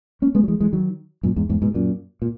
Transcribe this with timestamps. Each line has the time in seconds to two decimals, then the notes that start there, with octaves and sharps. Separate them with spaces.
0.22 A#3 C#4
0.35 G#3 B3
0.44 F#3
0.48 E3 G#3
0.60 E3 G#3
0.73 D#3 F#3
1.23 F#2 A#2
1.36 E2 G#2
1.49 E2 G#2
1.62 G#2 B2
1.74 F#2 A#2
2.22 A#2